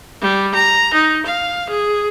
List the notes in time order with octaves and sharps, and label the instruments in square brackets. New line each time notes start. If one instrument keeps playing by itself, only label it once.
[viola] G3
A#5
D#4
F5
G#4